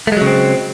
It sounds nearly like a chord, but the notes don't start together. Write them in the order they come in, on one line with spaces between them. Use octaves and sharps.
A3 G#3 F#3 C#3 C4